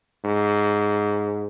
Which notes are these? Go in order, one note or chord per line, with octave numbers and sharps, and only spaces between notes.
G#2